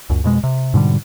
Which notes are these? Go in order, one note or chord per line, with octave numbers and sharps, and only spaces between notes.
C#2 F#2
F2 B2 G#3
C3
G#2 B2 D3 G3